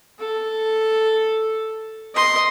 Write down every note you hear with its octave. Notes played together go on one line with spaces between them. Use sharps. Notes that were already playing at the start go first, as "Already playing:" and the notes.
A4
D#5 C6